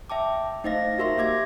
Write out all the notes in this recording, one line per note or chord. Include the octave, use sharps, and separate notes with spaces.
E5 G5 A5 D6
A3 D#4 C5 D#5 F5 A#6
F#4 G4 A#4 E5 C6 A#6
A#3 E5 D6 G#6 A#6